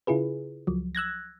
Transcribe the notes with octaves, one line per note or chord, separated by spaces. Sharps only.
C#3 E4 F4 G#4 B4
C#2 F3 F#3
E6 F#6 G#6 A#6